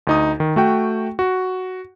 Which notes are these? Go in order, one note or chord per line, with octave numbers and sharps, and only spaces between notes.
D2 D#4 D#6
D#3
A3 F#4 G5
F#4